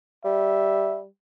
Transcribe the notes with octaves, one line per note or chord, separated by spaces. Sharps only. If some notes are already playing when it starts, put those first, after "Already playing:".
G3 E5